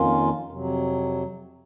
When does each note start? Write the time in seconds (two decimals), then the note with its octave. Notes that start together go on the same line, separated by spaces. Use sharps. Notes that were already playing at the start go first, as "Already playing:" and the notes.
Already playing: F2 D#3 A#3 C#4 F4
0.49 F2 C3 F#3